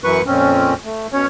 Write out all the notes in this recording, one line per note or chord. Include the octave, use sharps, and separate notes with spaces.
F#2 E3 F#3 B4 C#6
F2 A#2 C4 C#4
A3
B2 C#4 C#5